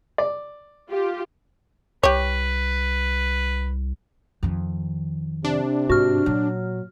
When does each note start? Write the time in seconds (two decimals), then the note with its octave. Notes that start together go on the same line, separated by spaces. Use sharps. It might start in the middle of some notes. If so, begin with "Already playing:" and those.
0.18 D5
0.89 F4 G4
2.03 C2 G4 B4 C#5
4.43 F2 D#3
5.45 C3 D4
5.90 G#2 F#4 F6
6.26 A#2 F#3